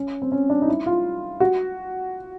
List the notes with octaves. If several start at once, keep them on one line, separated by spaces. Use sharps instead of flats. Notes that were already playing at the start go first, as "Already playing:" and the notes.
Already playing: C#4
C4
C#4
D4
D#4
E4
F4
F#4